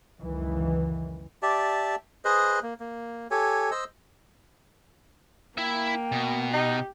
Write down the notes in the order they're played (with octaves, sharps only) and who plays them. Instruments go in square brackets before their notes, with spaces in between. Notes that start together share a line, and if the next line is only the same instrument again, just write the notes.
[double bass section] C#2 F#2 D#3 E3
[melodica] G4 D5 E5 A5
G#4 B4 C5 D#5
A#3
A#3
G4 A4 C#5 G#5
C5 D#5 E6
[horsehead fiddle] A#3 [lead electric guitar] E4 E5 [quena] G5
[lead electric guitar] B2
[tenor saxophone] D#4 [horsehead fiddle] G4